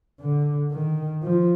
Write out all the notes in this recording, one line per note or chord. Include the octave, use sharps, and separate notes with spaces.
D3
D#3
F3